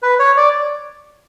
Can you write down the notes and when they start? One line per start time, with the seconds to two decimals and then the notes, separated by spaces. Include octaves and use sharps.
0.03 B4
0.19 C#5
0.37 D5